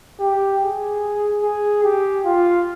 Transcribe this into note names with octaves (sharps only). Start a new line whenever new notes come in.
G4
G#4
G#4
G4
F4